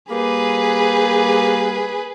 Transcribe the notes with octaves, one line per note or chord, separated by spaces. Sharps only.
G3 A#3 G#4 B4